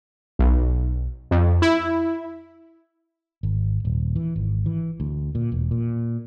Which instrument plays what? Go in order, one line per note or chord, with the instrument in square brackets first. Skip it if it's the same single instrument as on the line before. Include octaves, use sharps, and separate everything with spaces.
[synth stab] B1
F2
E4
[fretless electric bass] G#1
D#1
E3
G#1
E3
D2
A#2
E1
A#2